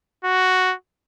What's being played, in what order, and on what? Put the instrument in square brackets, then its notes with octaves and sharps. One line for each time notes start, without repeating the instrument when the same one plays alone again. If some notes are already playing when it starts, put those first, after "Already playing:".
[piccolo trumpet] F#4